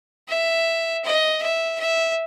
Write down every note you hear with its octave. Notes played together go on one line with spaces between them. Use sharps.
E5
D#5
E5
E5